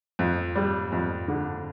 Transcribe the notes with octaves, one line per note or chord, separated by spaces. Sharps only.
F2
G3
F2
D3